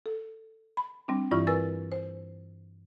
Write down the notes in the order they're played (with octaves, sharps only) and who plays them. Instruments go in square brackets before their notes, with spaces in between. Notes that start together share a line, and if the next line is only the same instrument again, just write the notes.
[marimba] A4
B5
G3 C4 D4
G2 E3 E4 F4 D5 C#6
A#4 B4 G#5 E6 A6
C5